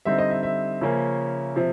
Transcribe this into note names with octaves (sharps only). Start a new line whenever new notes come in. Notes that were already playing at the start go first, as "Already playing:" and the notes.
D3 G3 C4 D#4 E5
D#5
E5
E5
C#3 F3 A#3 C#4
C3 F3